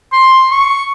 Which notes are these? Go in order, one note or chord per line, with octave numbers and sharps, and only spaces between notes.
C6
C#6